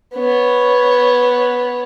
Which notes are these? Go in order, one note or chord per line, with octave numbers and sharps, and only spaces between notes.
B3 C#5